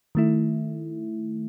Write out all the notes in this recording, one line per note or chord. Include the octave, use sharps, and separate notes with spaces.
D#3 A3 E4